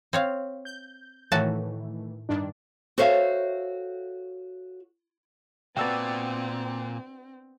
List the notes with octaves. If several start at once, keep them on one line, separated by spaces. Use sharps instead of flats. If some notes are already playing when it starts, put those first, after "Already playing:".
C4 C#5 F5
G6
A2 D#3 E3 A3 F#4 A5
G2 D#3 D4
F#4 A4 C5 C#5 E5 F5
A#2 B3 C4 D4 F#4 G5 E6 A6